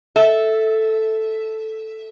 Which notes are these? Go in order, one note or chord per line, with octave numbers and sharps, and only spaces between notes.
A4 E5